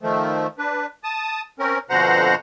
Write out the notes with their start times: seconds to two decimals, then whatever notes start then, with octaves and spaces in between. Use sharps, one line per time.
0.01 D#3 F3 A3
0.58 D4 B4
1.04 A5 D#6
1.59 C4 C#4 A#4
1.90 F2 B2 D3 C5 F#5 A#5